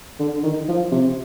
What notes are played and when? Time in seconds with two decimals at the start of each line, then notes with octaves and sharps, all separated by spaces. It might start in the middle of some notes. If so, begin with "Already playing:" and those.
0.20 D3
0.44 D#3
0.68 F3
0.92 C3